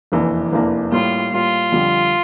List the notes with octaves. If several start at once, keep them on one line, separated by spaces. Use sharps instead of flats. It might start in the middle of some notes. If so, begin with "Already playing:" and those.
F1 E2 E3 A#3 D4
F1 E2 E3 A#3 D4
A2 G3 A#3 F4
A2 G3 A#3 F4
F2 D3 G3